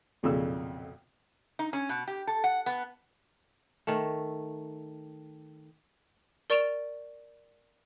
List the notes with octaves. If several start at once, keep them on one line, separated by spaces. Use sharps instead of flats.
B1 F2 A#2 C#3 E6
D#4
C#4
B2
G4
A4
F#5
B3
D#3 A3
A#4 D5 C#6 D7 E7 F7